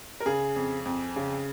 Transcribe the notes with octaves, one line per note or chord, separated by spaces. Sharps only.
A#4
C#3 G#4
F2
F2
C#3